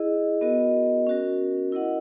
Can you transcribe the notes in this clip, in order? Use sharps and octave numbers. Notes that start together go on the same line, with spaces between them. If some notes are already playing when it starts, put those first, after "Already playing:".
Already playing: E4 G#4 D#5
B3 F#4 A#4 D#5
C#4 F#4 A#4
E4 A#4 D#5 F#5